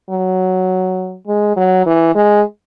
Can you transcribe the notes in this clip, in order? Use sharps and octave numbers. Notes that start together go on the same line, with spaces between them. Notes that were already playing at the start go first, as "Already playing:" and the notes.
F#3
G#3
F#3
E3
G#3